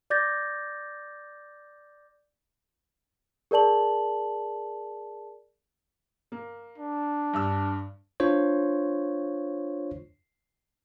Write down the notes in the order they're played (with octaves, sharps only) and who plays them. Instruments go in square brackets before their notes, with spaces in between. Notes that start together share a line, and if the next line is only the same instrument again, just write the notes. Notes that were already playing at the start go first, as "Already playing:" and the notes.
[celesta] D5 D6 G6 A6 A#6
G#4 A#4 D5 A5 F#7
[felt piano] A#3
[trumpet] D4
[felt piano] G2 E6
[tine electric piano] D4 F4 C5 C#5